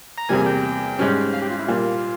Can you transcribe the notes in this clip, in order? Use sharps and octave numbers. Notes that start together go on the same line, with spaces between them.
A#5
E2 C3 G3 A#3 G#5
G5
G#2 G3 C#4
F5
G4
F4
E4
A#2 G3 A#3 F4